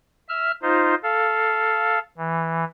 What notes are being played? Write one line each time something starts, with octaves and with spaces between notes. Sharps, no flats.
E5 F6
D#4 F4 C5
A4 F5
E3